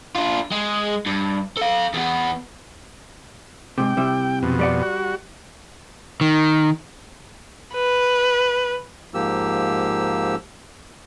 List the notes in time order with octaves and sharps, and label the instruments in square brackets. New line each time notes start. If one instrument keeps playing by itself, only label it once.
[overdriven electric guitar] D4 F4
G#3
G2
A4 F5
E2 B3
[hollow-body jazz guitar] G#2 C3 [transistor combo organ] G5
[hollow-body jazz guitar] C3 G3 E4
[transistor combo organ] F2 B2
[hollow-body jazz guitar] G3 D5 F#5
[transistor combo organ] F#4
[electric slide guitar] D#3
[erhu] B4
[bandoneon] G#2 F3 A#3 G4 E6